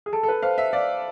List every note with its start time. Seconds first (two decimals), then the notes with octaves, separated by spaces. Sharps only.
0.06 G#4
0.13 A4 A5
0.23 A4
0.28 B4
0.42 C5 F5
0.58 E5
0.73 D5 F5